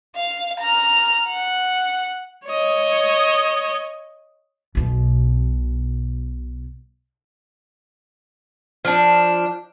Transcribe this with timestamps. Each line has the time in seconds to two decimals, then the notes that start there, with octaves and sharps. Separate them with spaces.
0.15 F5
0.60 A#5 F6
1.28 F#5
2.47 C#5 D#5
4.75 B1 B2
8.85 F3 D4